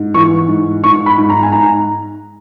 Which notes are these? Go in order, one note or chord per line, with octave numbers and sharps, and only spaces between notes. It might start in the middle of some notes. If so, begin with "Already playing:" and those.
Already playing: G#2
E3 C#6
G#2
G#2 C#6
B5
G#2
A#5
G#5
G#2 A#5